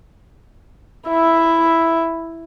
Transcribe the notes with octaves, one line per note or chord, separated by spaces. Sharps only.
E4 E5